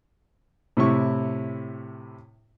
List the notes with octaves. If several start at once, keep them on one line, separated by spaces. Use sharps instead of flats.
A2 C3 E4 C#6